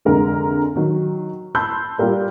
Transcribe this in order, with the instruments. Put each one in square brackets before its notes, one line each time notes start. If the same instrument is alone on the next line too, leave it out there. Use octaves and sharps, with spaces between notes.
[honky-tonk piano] F1 D3 G#3 A#4 A#5
D#3 F#3
A5 B5 C6 E6 F#6 G6
G3 F4 G4 A#4 D5